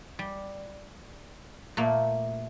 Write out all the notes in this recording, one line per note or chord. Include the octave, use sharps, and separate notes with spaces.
G3
A#2 A3 A#3